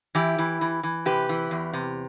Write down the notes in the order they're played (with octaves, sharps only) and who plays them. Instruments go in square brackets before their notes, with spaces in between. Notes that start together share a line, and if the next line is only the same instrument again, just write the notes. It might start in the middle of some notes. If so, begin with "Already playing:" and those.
[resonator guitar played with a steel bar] E3 E4 G4
E3
E3
E3
C3 G4 B4
E3
E2
C3